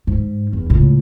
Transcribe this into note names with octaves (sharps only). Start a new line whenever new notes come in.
G#2
E2
C#2 A2